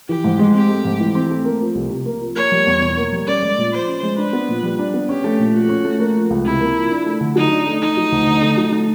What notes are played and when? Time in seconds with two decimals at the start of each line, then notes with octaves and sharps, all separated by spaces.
0.09 E3 G4
0.24 G#2
0.39 G#3
0.54 C4 G4
0.69 A3
0.85 G#2
1.00 E3
1.15 C4
1.30 A3
1.45 A#3
1.60 F3
1.75 C2
1.90 C3
2.06 A#3
2.21 F3
2.36 A#3 C#5
2.52 G3
2.67 E2
2.82 B2
2.97 A#3
3.12 G3
3.27 C#4 D5
3.43 G#3
3.58 A#2
3.73 F3 C5
3.87 C#4
4.03 G#3
4.18 D4 B4
4.33 B3
4.49 A#2
4.63 G3
4.79 D4
4.94 B3
5.08 C#4 G4
5.24 A3
5.39 A#2
5.54 F3 F#4
5.69 C#4
5.85 A3
6.00 A#3
6.15 F3
6.30 C#2
6.45 C3 E4
6.60 A#3
6.76 F3
6.91 D4
7.06 A3
7.21 D3
7.36 F#3 D#4
7.51 D4
7.66 A3
7.82 A3 D#4
7.97 F#3
8.12 D2
8.27 D3
8.42 A3
8.57 F#3
8.72 A3